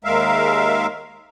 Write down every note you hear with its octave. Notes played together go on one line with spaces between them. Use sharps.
D#2 G#3 A#4 E5 F5